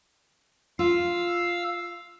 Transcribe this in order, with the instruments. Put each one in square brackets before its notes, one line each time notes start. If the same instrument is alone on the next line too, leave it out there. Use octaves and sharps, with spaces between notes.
[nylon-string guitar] F4 [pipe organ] F5 E6